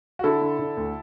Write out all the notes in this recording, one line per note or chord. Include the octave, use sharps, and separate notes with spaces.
F#4
D3 E4 A4
D3
D3
D2